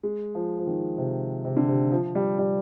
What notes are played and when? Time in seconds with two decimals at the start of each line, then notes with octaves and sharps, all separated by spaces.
0.03 G#3
0.35 F3
0.59 F3
0.67 D#3
0.98 C3
1.45 C3
1.57 D3
1.68 C3
1.91 F3
2.15 G3
2.39 G3